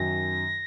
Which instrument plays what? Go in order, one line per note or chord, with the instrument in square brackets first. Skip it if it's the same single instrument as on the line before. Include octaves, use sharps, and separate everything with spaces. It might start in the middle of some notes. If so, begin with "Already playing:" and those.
Already playing: [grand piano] F#2 D#3 F#3 [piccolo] A#6